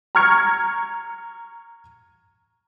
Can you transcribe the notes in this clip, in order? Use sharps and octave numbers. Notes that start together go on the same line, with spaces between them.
A#5 C#6 F6 G#6 C#7